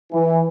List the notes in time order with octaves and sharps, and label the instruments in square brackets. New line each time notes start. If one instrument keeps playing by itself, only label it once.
[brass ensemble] E3